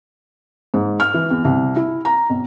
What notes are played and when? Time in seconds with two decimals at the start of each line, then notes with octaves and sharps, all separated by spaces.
0.74 G#2
1.00 F6
1.14 E3
1.30 E2
1.45 C2
1.76 E4
2.05 A#5
2.30 B1